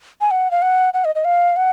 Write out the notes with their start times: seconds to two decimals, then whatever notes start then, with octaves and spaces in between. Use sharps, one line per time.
0.21 G#5
0.31 F#5
0.51 F5
0.62 F#5
0.94 F#5
1.05 D#5
1.15 D#5
1.25 F5
1.56 F#5